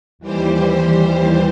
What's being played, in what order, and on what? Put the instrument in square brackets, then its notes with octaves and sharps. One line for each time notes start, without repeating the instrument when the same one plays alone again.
[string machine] D#2 E3 G3 G4 C5